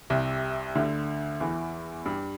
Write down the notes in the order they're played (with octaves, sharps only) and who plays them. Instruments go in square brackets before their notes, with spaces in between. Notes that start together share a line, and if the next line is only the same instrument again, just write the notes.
[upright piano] C2 C3
D2 D3
E2 E3
G2 G3